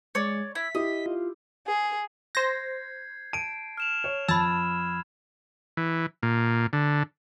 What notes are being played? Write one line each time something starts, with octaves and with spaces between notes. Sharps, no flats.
G#3 C#5 D5
E4 B6
E4 G4 D#5
F4
G#4
C5 G6 G#6 A#6 C7
A5 D7 D#7
F6 E7 F7
C#5
F2 A5 B5 E6 G#6
E3
A#2
D3